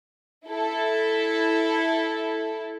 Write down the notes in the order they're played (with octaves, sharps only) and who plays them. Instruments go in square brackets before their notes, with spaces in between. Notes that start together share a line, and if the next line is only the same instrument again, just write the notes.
[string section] E4 A4